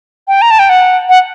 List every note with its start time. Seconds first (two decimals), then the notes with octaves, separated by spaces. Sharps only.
0.28 G5
0.42 A#5
0.51 A5
0.59 G5
0.69 F#5
1.09 F#5